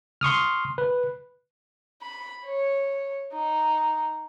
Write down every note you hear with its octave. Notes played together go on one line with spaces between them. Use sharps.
C6 C#6 D#6 F6
B4
B5
C#5
D#4